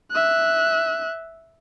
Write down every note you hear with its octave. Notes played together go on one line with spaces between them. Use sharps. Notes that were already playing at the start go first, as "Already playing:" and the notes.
E5 F#6